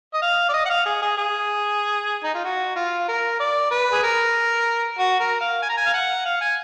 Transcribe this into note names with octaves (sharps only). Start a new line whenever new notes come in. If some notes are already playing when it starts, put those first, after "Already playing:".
D#5
F5
D5
D#5
F#5
F5
G#4
G#4
G#4
D#4
F4
F#4
F4
A#4
D5
B4
G#4
A#4
F#4
A#4
F5
G#5
A#5
G#5
F5
F#5
F5
G#5